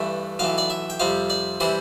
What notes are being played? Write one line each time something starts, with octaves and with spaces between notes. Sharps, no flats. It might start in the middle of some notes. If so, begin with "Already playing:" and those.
Already playing: G2 E3 A3
B1 A2 E3 F5
D5
E5
G5
F2 C3 G3 F5
D5
C3 E3 G3 C5